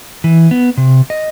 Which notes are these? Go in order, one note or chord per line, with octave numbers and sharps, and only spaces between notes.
E3
B3
C3
D#5